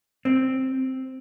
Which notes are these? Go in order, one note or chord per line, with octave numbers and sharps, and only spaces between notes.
C4